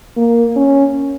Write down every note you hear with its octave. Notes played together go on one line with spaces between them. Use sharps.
A#3
C#4